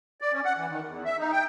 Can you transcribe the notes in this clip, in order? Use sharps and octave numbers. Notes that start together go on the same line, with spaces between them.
D5
C#4
F#5
E3
D#3
E2
E5
D#4
G5